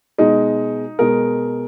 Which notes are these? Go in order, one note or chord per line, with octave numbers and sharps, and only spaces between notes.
B2 G#3 D#4
B2 G#3 A#4